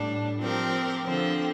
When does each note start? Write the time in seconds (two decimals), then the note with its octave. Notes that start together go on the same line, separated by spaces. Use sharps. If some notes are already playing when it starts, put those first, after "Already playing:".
Already playing: A2 G3 D4
0.39 F3 C4 G4 A#4
1.04 D3 F3 C4